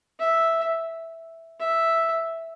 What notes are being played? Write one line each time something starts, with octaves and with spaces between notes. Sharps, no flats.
E5
E5